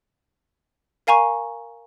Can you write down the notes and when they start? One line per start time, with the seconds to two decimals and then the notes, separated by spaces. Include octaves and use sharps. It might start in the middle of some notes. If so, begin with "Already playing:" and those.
1.07 A#4 F5 G#5 A#5 C#6